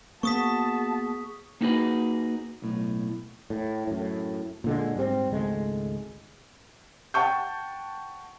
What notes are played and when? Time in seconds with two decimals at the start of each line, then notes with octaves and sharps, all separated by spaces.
0.23 A#3 B3 F#4 G#4 A5 C#6 D#6 B6
1.61 A#3 B3 D#4 F#4 G#4 B4
2.62 B1 A2
3.50 A2
3.87 F#2 A2
4.64 A#2 D3 G#3
4.96 G#2 G3 C4
5.30 G#1 C#2 G#3 A3
7.14 F#5 G5 A5 C#6 G6